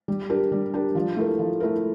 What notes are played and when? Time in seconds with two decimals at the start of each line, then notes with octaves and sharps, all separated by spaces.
0.08 G3
0.30 D4 G4 A#4
0.52 G3
0.74 D4 G4 A#4
0.95 F3
1.17 A3 E4 A#4
1.39 F3
1.60 A3 E4 A#4